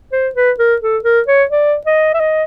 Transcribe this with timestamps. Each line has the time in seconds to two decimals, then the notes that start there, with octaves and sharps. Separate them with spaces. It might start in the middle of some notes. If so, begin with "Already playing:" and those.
0.12 C5
0.35 B4
0.59 A#4
0.82 A4
1.04 A#4
1.28 C#5
1.51 D5
1.86 D#5
2.14 E5
2.20 D#5